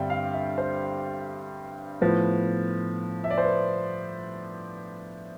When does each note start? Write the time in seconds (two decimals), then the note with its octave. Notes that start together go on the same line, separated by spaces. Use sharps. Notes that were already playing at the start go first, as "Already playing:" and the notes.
Already playing: G2 D3 G3 C4 D5 E5 G5
0.10 F5
0.34 E5
0.58 C5
2.01 A2 F3 B3
3.24 E5
3.31 D5
3.38 C5
3.45 B4